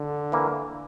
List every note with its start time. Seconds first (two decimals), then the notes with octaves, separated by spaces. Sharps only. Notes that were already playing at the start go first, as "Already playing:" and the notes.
Already playing: D3
0.32 E3 A#3